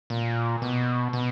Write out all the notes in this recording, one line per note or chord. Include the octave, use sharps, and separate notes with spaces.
A#2
B2
B2